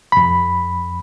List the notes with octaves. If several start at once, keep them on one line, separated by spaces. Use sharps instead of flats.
F2 B5